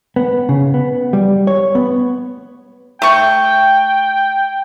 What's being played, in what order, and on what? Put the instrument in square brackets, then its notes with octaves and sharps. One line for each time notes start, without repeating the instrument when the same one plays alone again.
[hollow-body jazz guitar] B3
C#3
B3
G3
C#5
B3
[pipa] A3 C#6 [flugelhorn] G5